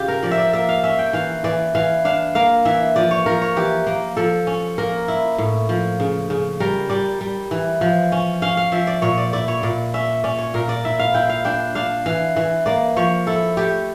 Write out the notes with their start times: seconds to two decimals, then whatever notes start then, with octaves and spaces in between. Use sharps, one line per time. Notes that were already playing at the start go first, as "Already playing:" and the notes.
Already playing: C#3 F4 G4
0.08 A#4
0.23 F3 D5
0.31 E5
0.38 D5
0.53 A#3 E5
0.69 F5
0.84 C#4 E5
0.99 G5
1.13 E3 F5
1.44 E3 D5
1.75 E3 F5
2.05 D4 F5
2.35 A#3 F5
2.65 E3 E5
2.96 F3 D5
3.11 C#5
3.26 F3 A#4
3.42 C#5
3.56 E3 G4
3.87 A#3
4.17 F3 A4
4.47 C#4
4.78 A#3 A#4
5.08 E4
5.38 A2
5.69 F3
6.00 C#3
6.30 C#3
6.60 G3 A#4
6.90 G3 D5
7.21 G3
7.51 E3
7.81 F3
8.12 C#4
8.42 C#4 F5
8.57 F5
8.72 F3 E5
8.87 D5
9.02 A#2 C#5
9.18 D5
9.33 E4 D5
9.48 C#5
9.63 A#2 D5
9.94 C#4 E5
10.24 C#4 D5
10.38 C#5
10.54 A#2 A#4
10.69 D5
10.85 E4 E5
10.99 F5
11.14 E4 G5
11.29 F5
11.45 D4 G5
11.75 D4 F5
12.06 E3 F5
12.36 E3
12.66 A#3 D5
12.96 F3 C#5
13.27 E4 A4
13.57 A3 G4